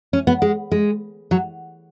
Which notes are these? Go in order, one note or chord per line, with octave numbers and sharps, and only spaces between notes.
C#4
B3
G#3
G#3
F#3